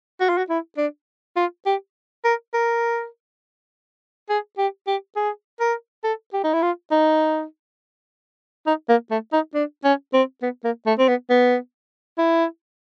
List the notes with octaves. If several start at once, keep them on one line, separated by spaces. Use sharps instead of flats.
F#4
F4
F#4
E4
D4
F4
G4
A#4
A#4
G#4
G4
G4
G#4
A#4
A4
G4
D#4
E4
F4
D#4
D#4
A#3
A3
D#4
D4
C#4
C4
B3
A#3
A3
C4
B3
B3
E4